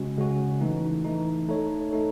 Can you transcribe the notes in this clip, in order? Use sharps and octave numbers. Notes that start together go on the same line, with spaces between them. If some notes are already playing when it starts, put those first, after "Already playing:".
Already playing: C#3 G#3 C#4 F#4
C#3 G#3 C#4 F#4
E3 A3 D#4
E3 A3 D#4
A3 D#4 A4 C#5
A3 D#4 A4 C#5